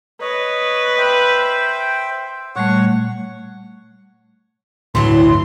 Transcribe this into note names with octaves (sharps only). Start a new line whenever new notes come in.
B4 C#5 D#5
C5 E5 G5
A#2 G3 A3 C#5 F#5 C#6
G1 D2 A2 E3 F#3 A3 C6